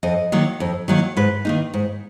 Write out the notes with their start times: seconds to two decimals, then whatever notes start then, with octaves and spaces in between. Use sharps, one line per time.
0.03 F2 D#5
0.32 D#3 F#3 A#3
0.60 F2
0.88 D#3 F#3 A#3
1.17 G#2 B4
1.45 D#3 A#3 D#4
1.74 G#2